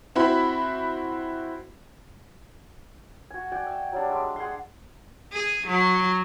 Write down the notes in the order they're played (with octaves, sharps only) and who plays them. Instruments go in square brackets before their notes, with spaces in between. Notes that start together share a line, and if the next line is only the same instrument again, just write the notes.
[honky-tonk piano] C4 E4 F#4 B5
[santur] F#4 G#5
F#4 D5 G5 G#5
E5
F#3 G3 D4
G#3 D5 E5
G#4 F#5 C6
[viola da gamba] G#4
F#3